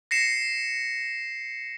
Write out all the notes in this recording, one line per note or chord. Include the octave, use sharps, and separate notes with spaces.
A#6 C7 C#7 E7